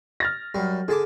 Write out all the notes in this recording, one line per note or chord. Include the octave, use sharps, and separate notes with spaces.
F6 A6 A#6
F#2 G3
D3 G#4 A5 D6